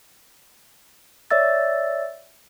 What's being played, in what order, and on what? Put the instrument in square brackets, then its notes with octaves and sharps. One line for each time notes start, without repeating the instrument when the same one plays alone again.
[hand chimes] C#5 D5 E5 E6 A6